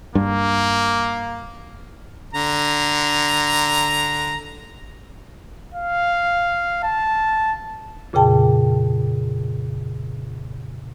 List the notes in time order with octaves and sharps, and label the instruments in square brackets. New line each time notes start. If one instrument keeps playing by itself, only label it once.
[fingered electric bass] G2 [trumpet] A#3
[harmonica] D3 A#5
[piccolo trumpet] F5
A5
[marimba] F2 A#2 C#3 G#4 G5 A5